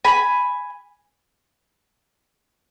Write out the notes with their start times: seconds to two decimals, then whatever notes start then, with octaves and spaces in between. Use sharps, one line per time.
0.05 G#5 B5